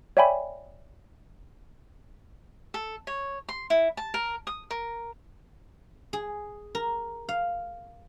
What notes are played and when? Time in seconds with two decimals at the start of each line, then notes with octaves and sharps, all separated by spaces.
0.17 C#5 D5 E5 G5 G#5 B5
2.74 A4
3.07 C#5
3.49 C6
3.70 E4
3.97 A5
4.14 A#4
4.47 D#6
4.71 A#4
6.13 G#4
6.75 A#4
7.29 F5